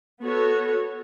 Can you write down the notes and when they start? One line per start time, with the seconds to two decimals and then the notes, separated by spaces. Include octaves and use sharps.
0.22 B3 F#4 A4 C#5